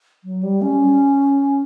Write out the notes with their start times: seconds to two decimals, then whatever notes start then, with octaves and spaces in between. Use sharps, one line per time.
0.24 F#3
0.43 G3
0.62 C#4